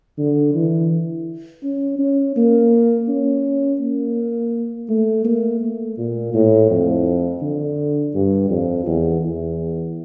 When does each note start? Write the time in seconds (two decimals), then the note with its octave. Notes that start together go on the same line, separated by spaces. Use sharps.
0.19 D3
0.55 E3
1.63 C#4
1.99 C#4
2.36 A#3
3.09 C#4
3.80 A#3
4.89 A3
5.25 A#3
5.61 A3
5.98 A#2
6.34 A2
6.70 F2
7.42 D3
8.15 G2
8.50 F2
8.86 E2
9.23 E2